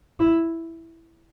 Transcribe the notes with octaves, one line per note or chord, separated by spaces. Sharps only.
E4